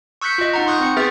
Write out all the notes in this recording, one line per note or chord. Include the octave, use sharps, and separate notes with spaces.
C#6 E6 F#6 G6 B6 C#7
F4 D#5
D#4 F#5 A#5
C6 C#6 D#6 F#6 G6
C4 C#6 C#7
B3 G#4 B4 E5 F6 A6